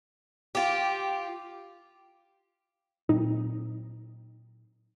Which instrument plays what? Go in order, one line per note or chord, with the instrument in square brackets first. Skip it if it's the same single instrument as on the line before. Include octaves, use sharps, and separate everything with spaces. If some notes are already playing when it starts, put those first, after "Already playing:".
[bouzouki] F4 G4
[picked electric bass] A#2 F#3 C4 [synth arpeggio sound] D#4